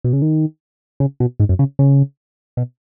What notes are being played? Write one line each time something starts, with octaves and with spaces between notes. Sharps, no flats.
B2
C#3
D#3
C#3
B2
G#2
F#2
C#3
C#3
B2